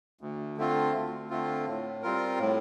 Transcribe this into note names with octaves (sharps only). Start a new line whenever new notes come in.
D2
D3 A3 C4 F4
D2
D3 A3 C4 F4
A2
G3 C4 F4 A#4
A2